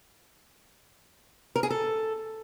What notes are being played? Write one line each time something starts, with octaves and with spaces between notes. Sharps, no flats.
A#4
G#4
A4